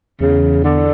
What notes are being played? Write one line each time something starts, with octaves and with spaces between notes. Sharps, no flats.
E2 C#3
D3